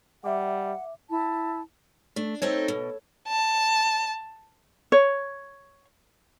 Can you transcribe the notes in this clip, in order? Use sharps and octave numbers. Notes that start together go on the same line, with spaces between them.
G3 E5 F#5 D6
E4 A5
A3 D4
A3 C4 D#4 A4 C#5
B2
A5
C#5